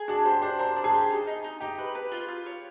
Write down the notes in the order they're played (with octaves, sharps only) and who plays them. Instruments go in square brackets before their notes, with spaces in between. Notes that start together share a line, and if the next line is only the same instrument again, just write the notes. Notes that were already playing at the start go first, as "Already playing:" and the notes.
Already playing: [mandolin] G#4
[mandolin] D4 [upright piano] F#4
[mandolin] G4 [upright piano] C5
[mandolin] D4 [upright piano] C5
[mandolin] A#4 [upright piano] C5
[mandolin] D4
[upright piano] G#4
[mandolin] G4
D#4
D#4
D#4
[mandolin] D#4 [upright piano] G4
[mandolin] B4
B4
F4
F4
C#5